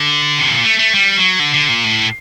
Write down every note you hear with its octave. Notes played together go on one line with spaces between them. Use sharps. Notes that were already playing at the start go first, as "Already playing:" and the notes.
Already playing: D3
C3
A#2
A3
A3
G3
F#3
D3
D3
A#2
A2